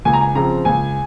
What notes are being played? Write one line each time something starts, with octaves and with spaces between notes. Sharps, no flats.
C#2 G#5
A#5
G#5
C#3 F3 C4 A#5
C#2 G#5